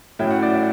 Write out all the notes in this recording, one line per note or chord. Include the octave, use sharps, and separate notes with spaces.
A2 F#3 C#4 E4 G5
F#5
D5
E5